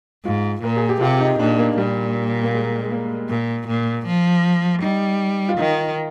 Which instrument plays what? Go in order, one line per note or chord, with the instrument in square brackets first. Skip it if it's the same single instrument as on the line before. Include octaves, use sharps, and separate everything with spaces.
[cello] G#2 [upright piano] F4
[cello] A#2 [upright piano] A#4
[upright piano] G#4
G4
[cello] C3 [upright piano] F4
[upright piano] D#4
[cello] A#2 [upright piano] D4
[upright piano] A#3
[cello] A#2 [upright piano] G3
[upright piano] A#3
G#3
G#3
A#3
[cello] A#2
A#2
F3
[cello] G3 [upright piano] D#4
[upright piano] F4
[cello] D#3 [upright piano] D#4